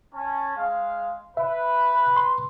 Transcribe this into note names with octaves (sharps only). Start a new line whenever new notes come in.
C#4 A5
G#3 F5
B4 E5
C6